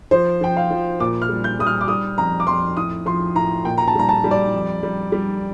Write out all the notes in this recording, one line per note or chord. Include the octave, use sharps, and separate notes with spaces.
F3 C5
F3 G5
F5
F3
A#2 D6
F6
G3
G6
G3 D#6
F6
D6
G3 D#6
F2 A#5
D6
F2 C6
A2 D#6
F3 C6
A2 A#5
A#2 G5
A#5
A5
G3 A#5
A5
G3
D5
F2
G3
G3